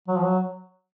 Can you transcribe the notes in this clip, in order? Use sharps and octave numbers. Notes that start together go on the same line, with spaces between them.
F#3
F3
F#3